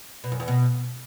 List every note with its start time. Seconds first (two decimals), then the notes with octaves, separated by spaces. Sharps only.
0.24 B2
0.32 F#2
0.40 E2
0.48 B2